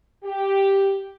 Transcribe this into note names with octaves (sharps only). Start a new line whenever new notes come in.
G4